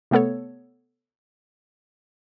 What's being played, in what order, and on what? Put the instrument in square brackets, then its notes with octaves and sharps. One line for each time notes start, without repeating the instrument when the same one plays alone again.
[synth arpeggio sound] C3 A3 B3 A4 C#5